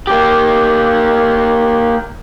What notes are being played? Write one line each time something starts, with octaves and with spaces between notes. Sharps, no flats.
A#3 G4